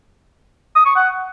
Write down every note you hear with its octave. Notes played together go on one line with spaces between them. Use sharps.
D#6
C#6
F#5